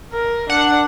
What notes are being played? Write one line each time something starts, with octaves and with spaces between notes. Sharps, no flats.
A#4
D4 F#5